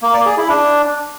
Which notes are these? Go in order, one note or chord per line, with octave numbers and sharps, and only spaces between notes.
A#3
D5
G#4
E4
D4